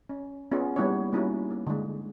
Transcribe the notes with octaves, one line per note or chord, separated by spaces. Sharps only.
C#4
B3 C#4 F4 G#4
G3 A#3 B3 D4 E4 C#5
G3 A#3 C#4 D#4 E4 F#4
A#3
D3 G#3